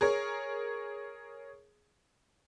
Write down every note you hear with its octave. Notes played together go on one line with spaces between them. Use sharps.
G#4 A#4 C#5